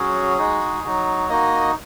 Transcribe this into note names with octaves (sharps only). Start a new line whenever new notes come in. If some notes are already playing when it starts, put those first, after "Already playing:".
Already playing: F#3 C#4 F#4 G#4
G#3 D#4 F#4
F#3 D#4 F#4
A#3 D#4 F#4 D#5